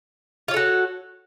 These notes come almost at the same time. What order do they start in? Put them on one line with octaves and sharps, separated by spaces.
F4 C#5 A4 F#4